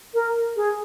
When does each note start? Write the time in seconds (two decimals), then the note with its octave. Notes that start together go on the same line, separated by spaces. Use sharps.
0.14 A#4
0.56 G#4